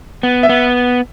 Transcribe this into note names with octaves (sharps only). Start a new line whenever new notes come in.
B3
E5
B3